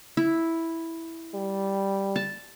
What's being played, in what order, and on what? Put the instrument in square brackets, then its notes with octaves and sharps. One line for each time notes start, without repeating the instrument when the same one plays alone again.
[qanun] E4
[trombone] G3
[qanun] A5